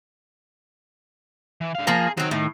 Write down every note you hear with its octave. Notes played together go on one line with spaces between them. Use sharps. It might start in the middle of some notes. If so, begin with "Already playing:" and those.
E3
D3 F5
F3 A#3 G#4 A#5
D#3 F#3 C4
A2